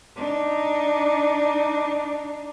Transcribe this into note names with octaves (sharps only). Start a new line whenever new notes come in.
D4 D#4